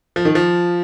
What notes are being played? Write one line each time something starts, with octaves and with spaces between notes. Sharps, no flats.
F3
D#3
F3